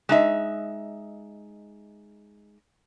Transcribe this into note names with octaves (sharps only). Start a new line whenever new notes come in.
G#3 D#4 E5